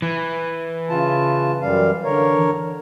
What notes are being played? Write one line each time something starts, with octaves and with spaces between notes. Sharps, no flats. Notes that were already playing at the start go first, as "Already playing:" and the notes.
E3
C#3 F4 A5
F#2 G3 F5
D3 A#4 C#5